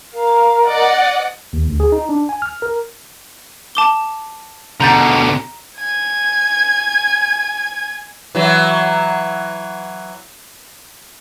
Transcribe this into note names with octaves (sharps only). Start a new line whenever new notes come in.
A#4 F5
D5 D#5 F#5
D#2
D2
G#4
D#4
D4
G#5
F6
A#4
A5 D6 G7
B2 D3 A#5 G6 A6
G#5 G#6
E3 F#3